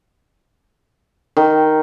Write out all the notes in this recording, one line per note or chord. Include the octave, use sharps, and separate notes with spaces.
D#3